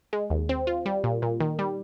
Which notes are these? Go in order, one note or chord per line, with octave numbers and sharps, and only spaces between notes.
G#3
D#2
C4
F4
G3
A#2
A#2
D#3
G3